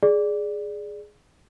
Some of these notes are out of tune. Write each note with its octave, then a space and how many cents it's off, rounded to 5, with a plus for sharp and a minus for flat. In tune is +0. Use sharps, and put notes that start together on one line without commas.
G#4 +5 D5 +0